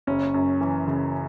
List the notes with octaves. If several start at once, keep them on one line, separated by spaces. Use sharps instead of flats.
F#1 C#4
F#2
E3
C#3